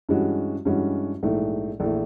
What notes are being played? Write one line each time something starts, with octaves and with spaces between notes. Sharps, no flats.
G2 E3 G#3 C#4 F#4
G2 E3 G#3 C#4 F#4
A#1 G#2 E3 A3
A#1 E3 A3